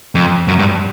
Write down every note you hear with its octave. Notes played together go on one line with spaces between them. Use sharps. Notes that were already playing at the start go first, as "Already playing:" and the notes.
F2
F#2
G2